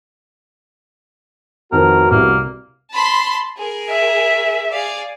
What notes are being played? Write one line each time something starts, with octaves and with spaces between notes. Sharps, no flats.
F2 A2 D#3 B3 F#4 A#4
C2 C3 A#3
A5 B5 C6
G#4 A#4
E5
G#4 D5 F5